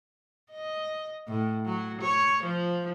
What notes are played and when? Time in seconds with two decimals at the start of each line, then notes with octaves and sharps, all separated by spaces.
0.52 D#5
1.28 A2
1.66 F#3
2.01 C#5
2.43 F3